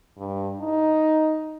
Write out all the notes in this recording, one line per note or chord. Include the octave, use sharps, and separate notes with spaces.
G2
D#4